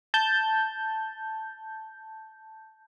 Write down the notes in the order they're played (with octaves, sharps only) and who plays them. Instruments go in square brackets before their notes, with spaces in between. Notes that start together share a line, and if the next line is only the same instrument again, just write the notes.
[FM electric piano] A5 G6